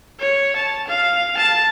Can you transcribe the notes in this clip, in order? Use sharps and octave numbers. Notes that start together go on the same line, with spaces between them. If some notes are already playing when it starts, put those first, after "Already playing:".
C#5
A5
F5
A5